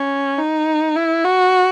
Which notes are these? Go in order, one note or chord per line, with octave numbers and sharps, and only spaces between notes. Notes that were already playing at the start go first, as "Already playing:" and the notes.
Already playing: C#4
D#4
E4
F#4